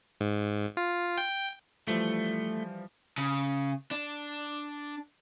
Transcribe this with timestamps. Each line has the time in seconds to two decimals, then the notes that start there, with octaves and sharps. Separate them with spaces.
0.21 G#2
0.77 F4
1.18 G5
1.88 E3 F3 G3 A3
3.18 C#3
3.91 D4